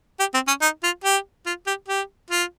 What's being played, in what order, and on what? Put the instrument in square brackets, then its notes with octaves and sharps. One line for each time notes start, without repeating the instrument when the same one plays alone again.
[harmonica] G4
C4
C#4
D#4
F4
G4
F4
G4
G4
F4